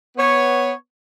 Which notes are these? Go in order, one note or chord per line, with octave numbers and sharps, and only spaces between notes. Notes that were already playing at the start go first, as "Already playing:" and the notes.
B3 C#5